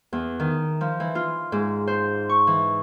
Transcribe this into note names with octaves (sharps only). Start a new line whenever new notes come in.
E2
D#3
F3
E3
F4
G#2
C5
C#6
E3